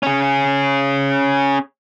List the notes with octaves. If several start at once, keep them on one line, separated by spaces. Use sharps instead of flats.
C#4 G#4